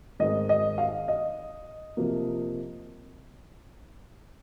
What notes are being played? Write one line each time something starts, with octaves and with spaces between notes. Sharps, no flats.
G#2 D#3 G#3 C4 D#5
D#5
F5
D#5
C3 F3 A#3